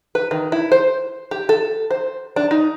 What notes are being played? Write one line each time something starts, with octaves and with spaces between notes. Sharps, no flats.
B4
D#3
E4
C5
G4
A4
C5
D4
D#4